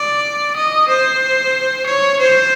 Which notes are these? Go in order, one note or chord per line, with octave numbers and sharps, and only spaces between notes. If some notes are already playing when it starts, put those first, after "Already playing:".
Already playing: D5
D#5
C5
C#5
C5